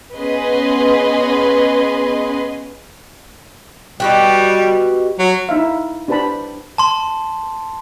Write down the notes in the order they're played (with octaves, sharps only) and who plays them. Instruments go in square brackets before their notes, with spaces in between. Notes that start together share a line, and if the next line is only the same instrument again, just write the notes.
[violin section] B3 C#4 G#4 B4 D#5 C6
[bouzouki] B2 F#4 G4 [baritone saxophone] G3
[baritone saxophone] F#3
[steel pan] D#4 E4 E5 F5
D4 G4 B4 C5 A5 B5
[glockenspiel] A5 C6